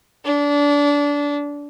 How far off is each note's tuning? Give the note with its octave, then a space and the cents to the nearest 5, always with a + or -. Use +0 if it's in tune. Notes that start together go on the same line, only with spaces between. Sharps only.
D4 -25